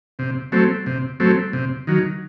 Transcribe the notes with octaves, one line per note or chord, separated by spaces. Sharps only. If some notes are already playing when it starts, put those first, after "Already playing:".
C3
F#3 A3 C4
C3
F#3 A3 C4
C3
D#3 F#3